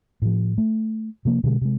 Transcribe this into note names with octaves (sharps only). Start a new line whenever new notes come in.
A2 F3
A3
C3 F3 A#3
B2 D3 F#3 G#3
C3 G#3